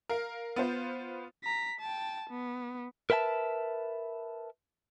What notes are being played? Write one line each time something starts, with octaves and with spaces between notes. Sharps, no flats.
A#4 F5
B3 F4 C5
A#5 B6
G5 A5
B3
A#4 B4 E5 G5 A5